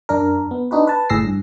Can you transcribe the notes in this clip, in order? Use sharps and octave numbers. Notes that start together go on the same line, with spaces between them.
F#2 D4 A#4
B3
D4 D#4 F#4 B4
B4 A5
G1 A2 G#4 E6 A#6 C7
G2